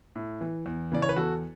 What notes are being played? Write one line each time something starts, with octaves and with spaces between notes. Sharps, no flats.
A2
E3
E2
C#3 E3 D5
C#5
B4
E2 F#4 A4